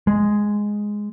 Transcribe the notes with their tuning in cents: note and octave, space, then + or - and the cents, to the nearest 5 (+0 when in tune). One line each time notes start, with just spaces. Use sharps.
G#3 +0